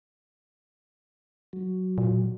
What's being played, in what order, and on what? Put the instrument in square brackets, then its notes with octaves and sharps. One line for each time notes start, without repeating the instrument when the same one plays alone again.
[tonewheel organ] F#3
[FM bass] A#2